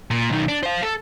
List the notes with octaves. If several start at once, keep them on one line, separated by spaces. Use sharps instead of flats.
A#2
B1 D#3
D4
C5 F5
A4